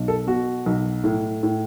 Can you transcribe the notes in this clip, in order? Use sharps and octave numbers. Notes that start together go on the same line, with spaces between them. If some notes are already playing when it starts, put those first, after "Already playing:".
Already playing: B1
A4
B2 F#4
B1
A2
A2